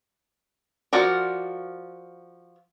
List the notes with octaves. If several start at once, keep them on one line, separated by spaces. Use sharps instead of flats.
F3 F4 F#4 A#4 D5